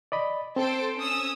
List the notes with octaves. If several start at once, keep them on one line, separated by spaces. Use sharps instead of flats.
D5 D#5 B5
C4 A4 C5 D7
C#4 D#6 E6